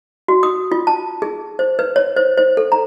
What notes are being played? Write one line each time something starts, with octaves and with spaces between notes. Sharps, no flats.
F#4
D#6
F4
A5
G#4
C5
B4
C#5
C5
C5
A4
A#5